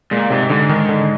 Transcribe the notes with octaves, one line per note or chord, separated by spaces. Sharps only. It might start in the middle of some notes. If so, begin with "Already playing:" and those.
A#2 G#3
G#2 C3
G#2 D3
D#3
D3